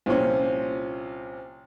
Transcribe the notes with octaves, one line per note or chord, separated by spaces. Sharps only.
C2 A#2 F3 C4 C#4